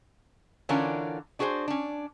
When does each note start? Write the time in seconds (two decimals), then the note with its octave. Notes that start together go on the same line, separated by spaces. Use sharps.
0.69 D3 E3 C#4 D4 F4 A#4
1.39 D4 F#4 G#4 A#4 C5
1.68 C#4 D4